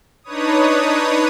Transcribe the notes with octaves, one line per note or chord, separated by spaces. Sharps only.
D4 D#4 B4 C#5 D#6